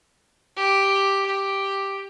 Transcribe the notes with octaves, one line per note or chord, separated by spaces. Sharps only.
G4
G4